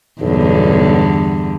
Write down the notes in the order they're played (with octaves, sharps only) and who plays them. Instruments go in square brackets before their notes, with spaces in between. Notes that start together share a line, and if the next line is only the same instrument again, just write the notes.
[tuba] B1 [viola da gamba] E2 G2 D3